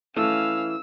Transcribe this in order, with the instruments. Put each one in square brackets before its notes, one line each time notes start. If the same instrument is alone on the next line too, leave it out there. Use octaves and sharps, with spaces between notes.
[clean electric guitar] E3 [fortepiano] A3 [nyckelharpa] C#4 F5 [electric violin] E6